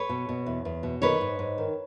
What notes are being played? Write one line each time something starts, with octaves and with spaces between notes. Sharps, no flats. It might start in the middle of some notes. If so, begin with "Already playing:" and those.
Already playing: B4 C#5
B2
B2
E2
E2
B2
D#3 B4 C#5
G#2
G#2
D#3